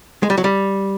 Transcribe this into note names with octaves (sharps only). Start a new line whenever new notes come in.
G#3
G3
F#3
G3